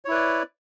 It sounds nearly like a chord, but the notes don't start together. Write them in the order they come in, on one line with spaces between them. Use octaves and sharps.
C#5 E4 B4 D5